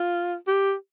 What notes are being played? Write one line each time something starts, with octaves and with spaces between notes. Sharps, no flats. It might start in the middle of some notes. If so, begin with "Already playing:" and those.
Already playing: F4
G4